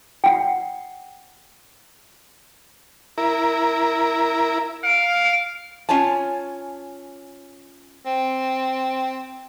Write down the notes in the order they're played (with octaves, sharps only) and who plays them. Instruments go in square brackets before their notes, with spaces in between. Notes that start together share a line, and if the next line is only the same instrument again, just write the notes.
[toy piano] F#5 G5
[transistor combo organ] E4 A#4
[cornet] F5 [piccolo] D7
[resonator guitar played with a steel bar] C#4 F4 C#5 G#5 A5
[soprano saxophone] C4